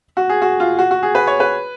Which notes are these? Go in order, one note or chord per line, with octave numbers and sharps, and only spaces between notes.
F#4
G#4
F#4
F4
F#4
F#4
G#4
B4
C#5
B4